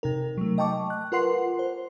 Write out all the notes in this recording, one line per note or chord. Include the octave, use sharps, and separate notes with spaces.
C3 D#4 A#4
F#3 A3
D#5 G5 A5 C#6 D6
F#6
F4 A#4 B4 F#5 C6 C7
C5